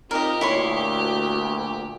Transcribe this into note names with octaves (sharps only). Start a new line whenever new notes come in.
C4 D#4 F4 G4 A#4 D#5
D2 A#2 E4 C#5 C6